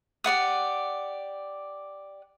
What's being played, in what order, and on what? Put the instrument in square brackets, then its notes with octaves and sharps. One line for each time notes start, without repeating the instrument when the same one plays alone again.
[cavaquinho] G4 D5 F#5 D#6